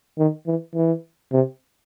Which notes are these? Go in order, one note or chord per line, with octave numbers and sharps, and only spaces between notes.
D#3
E3
E3
C3